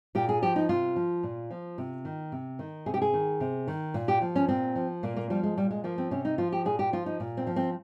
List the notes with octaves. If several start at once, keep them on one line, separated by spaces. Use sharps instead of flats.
A#2 G4
G#4
F3 G4
D#4
C3 F4
F3
A#2
F3
C3
D#3
C3
D#3
C3 G#4
G4
G#4
D#3
C3
D#3
A#2
G4
F3
C#4
A#2 C4
F3
A#2 A#3
A#3
F3 G3
G#3
A#2 G3
G#3
F3 A#3
C4
C3 C#4
D#4
F3 F4
G4
A#2 G#4
G4
F3 F4
D#4
A#2
C4
F3
C4